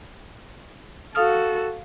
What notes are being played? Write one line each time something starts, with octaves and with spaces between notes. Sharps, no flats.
F#4 A4 F5 D#6 F6